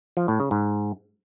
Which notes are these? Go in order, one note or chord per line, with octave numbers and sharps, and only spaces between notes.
F3
A2
C#3
G#2